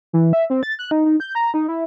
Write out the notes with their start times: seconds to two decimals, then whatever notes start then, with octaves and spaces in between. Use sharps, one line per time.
0.13 E3
0.33 E5
0.50 C4
0.63 A6
0.79 F#6
0.91 D#4
1.05 D#4
1.20 G6
1.35 A#5
1.54 D#4
1.68 E4